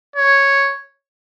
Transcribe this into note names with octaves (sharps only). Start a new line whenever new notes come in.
C#5